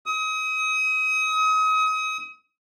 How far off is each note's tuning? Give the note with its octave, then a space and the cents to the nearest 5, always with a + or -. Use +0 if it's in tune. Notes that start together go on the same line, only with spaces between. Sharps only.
D#6 +35